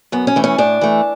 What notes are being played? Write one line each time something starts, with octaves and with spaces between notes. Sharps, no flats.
F#2 B3
C#4
E3 A3
C#4
A2 D4
E3 A3